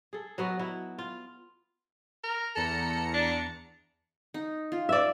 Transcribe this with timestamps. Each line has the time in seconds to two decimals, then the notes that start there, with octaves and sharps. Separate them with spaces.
0.13 G#4 A4
0.38 F#3 B3 F#4 D#5
0.59 F#3 E4
0.98 F4
2.24 A#4
2.56 E2 A4 A#5 C#7
3.14 D4
4.34 D#4
4.72 F4
4.89 D5 E5